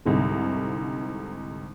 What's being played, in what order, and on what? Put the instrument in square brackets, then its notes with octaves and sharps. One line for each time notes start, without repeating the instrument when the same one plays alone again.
[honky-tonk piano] C2 G#2 D3